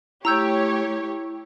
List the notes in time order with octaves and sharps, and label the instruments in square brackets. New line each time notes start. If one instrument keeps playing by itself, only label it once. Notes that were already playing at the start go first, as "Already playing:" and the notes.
[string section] A3 G4 C#5 [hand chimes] E4 [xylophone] A#5 E6 G6